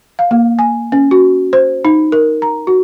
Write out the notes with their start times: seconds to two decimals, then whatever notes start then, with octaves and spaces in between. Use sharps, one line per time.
0.19 F5
0.31 A#3
0.59 G#5
0.92 C#4
1.11 F#4
1.53 C5
1.85 D#4
2.12 A#4
2.42 A#5
2.67 F#4